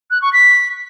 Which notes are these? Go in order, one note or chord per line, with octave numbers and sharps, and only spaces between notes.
F#6
C#6
B6